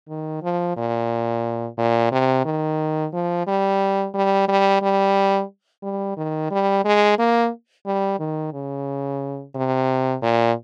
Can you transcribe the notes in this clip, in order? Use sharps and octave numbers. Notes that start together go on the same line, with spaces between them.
D#3
F3
A#2
A#2
C3
D#3
F3
G3
G3
G3
G3
G3
D#3
G3
G#3
A#3
G3
D#3
C#3
C3
A#2